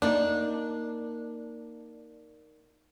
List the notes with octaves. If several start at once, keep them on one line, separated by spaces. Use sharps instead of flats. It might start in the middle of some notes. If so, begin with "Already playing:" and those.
A#3 D4 D#4